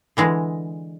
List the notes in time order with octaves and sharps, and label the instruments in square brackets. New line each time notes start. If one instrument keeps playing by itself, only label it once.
[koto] D3 E3 G#3